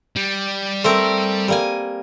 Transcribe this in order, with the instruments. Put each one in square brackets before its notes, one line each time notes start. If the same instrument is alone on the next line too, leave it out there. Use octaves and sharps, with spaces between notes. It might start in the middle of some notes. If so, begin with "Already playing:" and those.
[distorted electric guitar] G3
[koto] A3 C4 A#4
G3 A#3 G#5